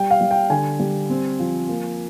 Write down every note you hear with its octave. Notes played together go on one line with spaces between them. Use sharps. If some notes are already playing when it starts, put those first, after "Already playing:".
Already playing: G3 G5
F5
G3
G5
D3 G#5
G3
C4
F3
A#3